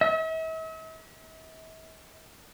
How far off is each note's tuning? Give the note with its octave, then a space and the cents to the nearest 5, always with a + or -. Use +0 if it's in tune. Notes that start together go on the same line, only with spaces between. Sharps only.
E5 -45